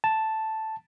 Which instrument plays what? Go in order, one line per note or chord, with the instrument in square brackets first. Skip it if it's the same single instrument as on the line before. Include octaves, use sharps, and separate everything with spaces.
[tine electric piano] A5